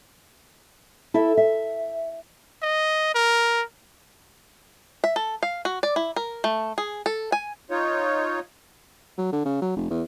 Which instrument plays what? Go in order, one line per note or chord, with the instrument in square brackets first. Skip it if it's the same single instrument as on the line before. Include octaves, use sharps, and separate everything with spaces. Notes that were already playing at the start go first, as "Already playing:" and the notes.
[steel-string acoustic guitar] E4 A4 E5
E5
[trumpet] D#5
A#4
[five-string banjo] E5
A4
F5
F#4
D5
E4
A#4
A3
G#4
A4
G#5
[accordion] D#4 F4 C#5
[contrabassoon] F#3
D3
C#3
F#3
F1
E2